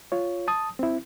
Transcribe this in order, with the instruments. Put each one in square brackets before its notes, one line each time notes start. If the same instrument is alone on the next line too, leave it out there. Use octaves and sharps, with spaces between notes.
[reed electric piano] F4 C#5
A5 D#6
C4 E4